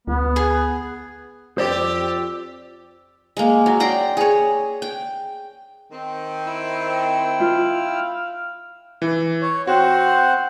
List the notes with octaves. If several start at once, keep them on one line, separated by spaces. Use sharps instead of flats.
D2 B3
G#4
F2 F4 G4 C5 D5 D6 E6
G#3 A#3
F#3
D5 G5 A#5 C6
G#4 C#5
G5
D#3 C4
E4 G5 E6
F4 F5
E3
C#5
C4 F#4 C5 F#5